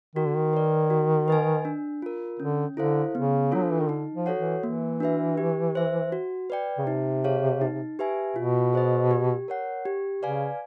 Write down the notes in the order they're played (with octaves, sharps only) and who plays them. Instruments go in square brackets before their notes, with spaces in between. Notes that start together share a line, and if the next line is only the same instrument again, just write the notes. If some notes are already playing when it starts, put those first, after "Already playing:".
[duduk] D#3 [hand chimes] F#4
[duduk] D3
D#3
[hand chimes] B4 D5
F#4
B4 D#5 G#5
D4
F4 A#4
[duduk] D3 [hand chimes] C#4
[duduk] D3 [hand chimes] E4 A4 C5 F5
[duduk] C#3 [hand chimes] B3
[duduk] F#3 [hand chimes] D4 F4 A4
[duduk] F3
E3
D#3
[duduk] D3 [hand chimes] D#4
[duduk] F3
[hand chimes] F#4 A4 C#5 F#5
[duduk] E3
[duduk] E3 [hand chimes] A#3
[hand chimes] D4 F#4 B4 E5
G4
C5 E5
F#4
B4 D5 G5
[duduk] C#3
[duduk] C3 [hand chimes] D#4
[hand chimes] G#4 C#5 F5
D#4
G4 B4 E5 G#5
[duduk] B2 [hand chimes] F4
[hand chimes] G#4 C5 D#5
G4
A#4 C#5 F#5
G4
[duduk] C#3 [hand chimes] B4 D5 F5 G#5